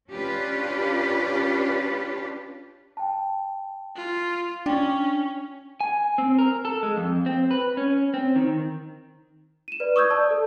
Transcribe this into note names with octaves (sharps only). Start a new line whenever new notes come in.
C#4 D4 F4 G4 B4
G5 A5
F4
C#4 D4 G5
G#5
C4
A#4
A4
G#3
F2
C4
B4
C#4
C4
D#3
D#7 E7
B4 D5
C#6 D#6 E6 G6 G#6
D5 A5
A4